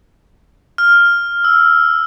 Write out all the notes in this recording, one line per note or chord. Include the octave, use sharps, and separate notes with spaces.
F6
E6